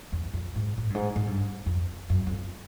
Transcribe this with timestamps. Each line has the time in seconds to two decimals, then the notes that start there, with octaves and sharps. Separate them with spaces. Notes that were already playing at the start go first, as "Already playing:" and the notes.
0.12 E2
0.34 F2
0.56 G#2
0.78 A2
0.90 G2
0.95 G#2
1.16 G#2
1.27 G2
1.66 F2
2.10 F#2
2.27 F2